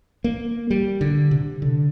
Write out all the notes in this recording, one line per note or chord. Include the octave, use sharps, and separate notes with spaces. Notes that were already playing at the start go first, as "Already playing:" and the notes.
A#3
G3
D3
C3
D3